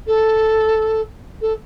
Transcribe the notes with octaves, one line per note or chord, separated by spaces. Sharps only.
A4
A4